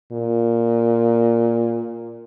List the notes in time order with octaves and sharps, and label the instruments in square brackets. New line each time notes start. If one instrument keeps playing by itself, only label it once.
[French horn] A#2